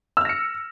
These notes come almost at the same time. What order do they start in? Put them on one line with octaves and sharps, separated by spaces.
E6 F6 A#6 C#7